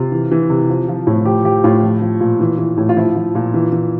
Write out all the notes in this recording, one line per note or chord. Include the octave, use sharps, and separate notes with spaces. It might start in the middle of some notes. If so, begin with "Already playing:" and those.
Already playing: C3 F4
E3
E3
C3
F3
F3
A2
F3 G4
F3 G4
A2 F4
F3
F3
A#2
E3
E3
A2
F4
F3 E4
F3
A#2
E3
E3